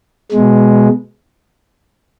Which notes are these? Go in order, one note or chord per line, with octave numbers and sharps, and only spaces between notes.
B2 G#3